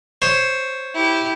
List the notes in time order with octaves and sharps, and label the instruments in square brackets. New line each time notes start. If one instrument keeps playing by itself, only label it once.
[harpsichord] C5 C#5
[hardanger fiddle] E4 G4